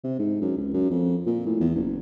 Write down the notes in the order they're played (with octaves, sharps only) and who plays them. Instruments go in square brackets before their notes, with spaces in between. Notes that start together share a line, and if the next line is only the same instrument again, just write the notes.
[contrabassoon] C3
G#2
F#2
C#2
F#2
F2
A#2
A2
E2
F#1